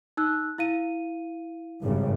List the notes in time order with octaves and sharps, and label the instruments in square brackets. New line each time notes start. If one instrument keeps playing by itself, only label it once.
[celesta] D#4 E6 F#6
E4 F5 D#7
[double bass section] G#1 G2 C#3